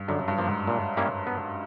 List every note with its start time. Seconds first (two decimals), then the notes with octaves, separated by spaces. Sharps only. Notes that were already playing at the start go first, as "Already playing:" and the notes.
Already playing: G2
0.08 F#2 D3
0.28 G2
0.38 F3 A#3
0.47 G#2
0.67 A#2
0.97 G3 A#3 C#4 E4
1.27 B3